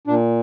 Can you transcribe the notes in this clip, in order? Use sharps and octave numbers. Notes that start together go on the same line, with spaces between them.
A#2 D4